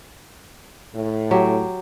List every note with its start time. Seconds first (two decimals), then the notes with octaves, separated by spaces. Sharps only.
0.94 A2
1.31 F#3 G4